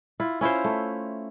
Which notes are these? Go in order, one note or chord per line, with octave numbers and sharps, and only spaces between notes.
E4 F4
C#4 E4 F4 C5
A3